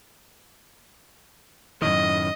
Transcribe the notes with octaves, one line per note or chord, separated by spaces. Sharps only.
F#2 A2 D#3 D#5